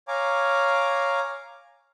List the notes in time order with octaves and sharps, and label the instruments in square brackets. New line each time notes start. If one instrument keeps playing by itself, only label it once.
[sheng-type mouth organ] C#5 F5 G#5 A#5 D6